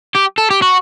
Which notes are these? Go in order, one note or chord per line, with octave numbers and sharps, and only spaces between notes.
G4
A4
G4
F#4